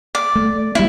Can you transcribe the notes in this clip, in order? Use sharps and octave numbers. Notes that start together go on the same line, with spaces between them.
D5
A3
G3 A#3 E4